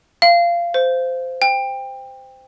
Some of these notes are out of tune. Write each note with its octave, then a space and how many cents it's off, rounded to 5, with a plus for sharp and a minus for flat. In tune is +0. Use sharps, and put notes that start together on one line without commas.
F5 -20
C5 -15
G5 +20